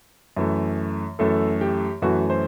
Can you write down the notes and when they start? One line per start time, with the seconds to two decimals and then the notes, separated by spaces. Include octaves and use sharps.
0.37 F#2 E3 A3
1.19 F#2 E3 A3 A4
1.61 G4
2.02 F#2 E3 A3 F#4
2.30 C5